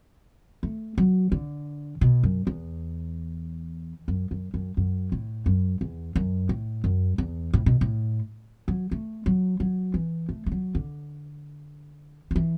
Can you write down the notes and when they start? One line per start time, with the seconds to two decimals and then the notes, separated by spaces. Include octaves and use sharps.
0.63 A3
0.98 F#3
1.32 D3
2.01 B2
2.23 F#2
2.47 E2
4.08 F#2
4.31 F#2
4.54 F#2
4.77 F#2
5.12 A2
5.46 F#2
5.81 E2
6.16 F#2
6.49 A2
6.84 F#2
7.18 E2
7.53 A2
7.66 B2
7.81 A2
8.68 F#3
8.91 A3
9.26 F#3
9.60 F#3
9.94 E3
10.29 A3
10.46 A3
10.52 F#3
10.75 D3
12.31 F#3
12.36 E3